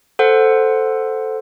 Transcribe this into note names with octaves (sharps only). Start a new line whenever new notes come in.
A4 C5 F#5